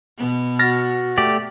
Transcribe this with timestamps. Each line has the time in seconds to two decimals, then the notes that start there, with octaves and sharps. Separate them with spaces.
0.17 B2 B3
0.59 F#4 F6 A6 A#6
1.18 A3 G4 D5